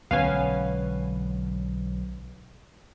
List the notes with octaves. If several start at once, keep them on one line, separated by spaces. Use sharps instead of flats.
B1 D3 G#3 B3 C#4 F5 G#5